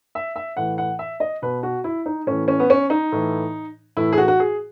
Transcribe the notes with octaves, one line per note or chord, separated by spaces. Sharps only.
E5
E5
A2 E3 F#5
F#5
E5
D#5
B2 B4
F#4
E4
D#4
A2 E3 C#4
C#4
B3
C#4
D#4
A2 E3
A2 E3 E4
G#4
F#4
F#4
G#4